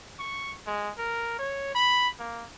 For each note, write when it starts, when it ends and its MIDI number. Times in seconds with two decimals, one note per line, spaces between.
0.19 0.53 85
0.66 0.91 56
0.98 1.36 70
1.39 1.74 73
1.75 2.09 83
2.19 2.46 58